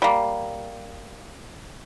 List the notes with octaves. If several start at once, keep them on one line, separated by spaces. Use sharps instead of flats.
G3 A#3